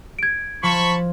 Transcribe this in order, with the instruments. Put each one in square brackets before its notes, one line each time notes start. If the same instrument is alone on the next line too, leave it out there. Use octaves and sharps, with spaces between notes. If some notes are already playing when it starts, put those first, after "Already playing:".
[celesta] G#6 D7
[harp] F3 [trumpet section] A5 B5 C#6